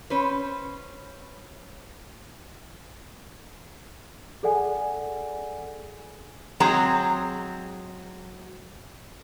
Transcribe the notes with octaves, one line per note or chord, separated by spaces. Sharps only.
C#4 B4 C5
G#4 A4 D5 F#5 G#5
F#3 G#3 C4 G#4 A#5